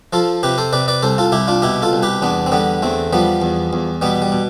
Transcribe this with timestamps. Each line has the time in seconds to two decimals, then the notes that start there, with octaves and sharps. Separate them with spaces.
0.13 F3 F4 A4
0.43 C3 G4 B4
0.58 A4 C5
0.73 C3 B4 D5
0.88 B4 D5
1.02 C2 A4 C5
1.18 F4 A4
1.32 C2 E4 G4
1.48 D4 F4
1.62 B2 E4 G4
1.82 F4 A4
1.93 C2
2.03 G4 B4
2.22 E2 B3 D4
2.46 C4
2.52 D3 G3 B3
2.82 E2 A3 C4
3.13 F3 G3 B3
3.42 E2
3.73 E2
4.01 B2 G3 B3
4.22 G3
4.32 B2